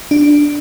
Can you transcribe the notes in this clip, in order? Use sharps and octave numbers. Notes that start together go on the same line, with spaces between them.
D4